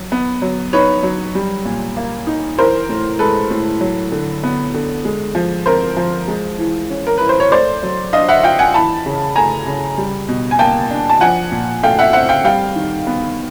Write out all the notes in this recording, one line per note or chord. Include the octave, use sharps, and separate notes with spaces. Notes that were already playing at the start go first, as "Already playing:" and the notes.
Already playing: F#3
B3
F#3
D#4 B4 C#5
F#3
G3
A#2
A#3
D#4
E3 A#4 C5
A2
G#3 A4 B4
A2
F#3
D3
B3
D3
G#3
F3
C4 A#4 C5
F3
G#3
E3
C#4
A#4
E4 B4
C5
C#5
A3 C5 D5
F#3
D4 D#5 F5
E5 F#5
F4 F5 G5
F#5 G#5
E3 A5 B5
C#3
A3 G#5 A#5
C#3
G3
B2
G#5
A#3 G5 A5
D4
A5
F3 F#5 G#5
A#2
A3 F5 G5
E5 F#5
C4 E5 F#5
F5 G5
G3 F5 G5
D#3
B3